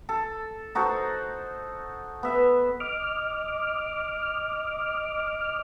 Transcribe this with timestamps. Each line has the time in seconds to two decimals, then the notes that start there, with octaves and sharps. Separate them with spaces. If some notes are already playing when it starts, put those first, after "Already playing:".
0.09 A4
0.75 D#4 F#4 A4 C5
2.23 B3 E5
2.80 D#5 D6 F6